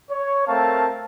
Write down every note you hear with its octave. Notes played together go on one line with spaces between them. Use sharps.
C#5
A3 C4 A#4 F5 A5